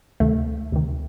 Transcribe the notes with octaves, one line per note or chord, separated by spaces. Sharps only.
D2 C3 D#3 A3
D2 C3 D#3